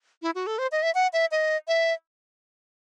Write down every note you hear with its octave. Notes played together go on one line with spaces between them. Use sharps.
E4
F#4
A4
C5
D#5
E5
F#5
E5
D#5
E5